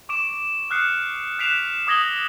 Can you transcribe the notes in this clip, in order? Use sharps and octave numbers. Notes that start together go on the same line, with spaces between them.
C#6 D6 D7 E7
D#6 F6 F#6 C7 C#7
F#6 B6 C7 D7 E7 F7
D6 D#6 G#6 A#6 F#7 G7